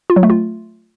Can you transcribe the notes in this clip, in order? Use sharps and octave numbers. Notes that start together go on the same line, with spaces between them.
F4
F#3
A3
F4